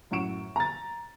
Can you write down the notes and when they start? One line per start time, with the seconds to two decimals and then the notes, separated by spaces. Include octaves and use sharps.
0.11 F#2 A2 F#5 C#6 D7 E7
0.56 A#5 A6